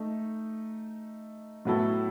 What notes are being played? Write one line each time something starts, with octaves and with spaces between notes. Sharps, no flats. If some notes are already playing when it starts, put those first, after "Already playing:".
Already playing: A3 D#4
A2 F#3 B3 E4 A4